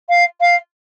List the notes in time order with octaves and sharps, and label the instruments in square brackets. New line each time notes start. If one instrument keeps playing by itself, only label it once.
[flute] F5
F5